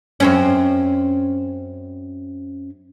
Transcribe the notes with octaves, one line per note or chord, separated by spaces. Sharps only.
F#2 C4 C#4